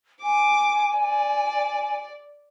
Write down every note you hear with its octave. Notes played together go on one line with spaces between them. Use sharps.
G#5 D6
D5